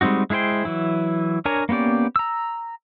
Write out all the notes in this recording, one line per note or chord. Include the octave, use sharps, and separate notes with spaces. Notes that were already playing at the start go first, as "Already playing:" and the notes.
G3 G#3 C4 D#4 F#4
G#3 E4 G#4 C5 G5
E3 F#3 E4
D4 A#4 C#5 G#5 A#5
A#3 B3 C#4 G4 D5
A#5 E6